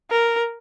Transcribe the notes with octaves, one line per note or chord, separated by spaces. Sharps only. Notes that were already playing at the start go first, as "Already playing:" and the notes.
A#4